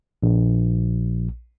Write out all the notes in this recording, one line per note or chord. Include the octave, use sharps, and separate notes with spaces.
A#1